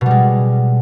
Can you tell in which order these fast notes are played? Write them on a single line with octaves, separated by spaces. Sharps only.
B2 G3 G#3